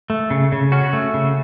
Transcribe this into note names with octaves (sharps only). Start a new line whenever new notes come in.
A3
C#3
C#3
C#4 F#4
A3
C#3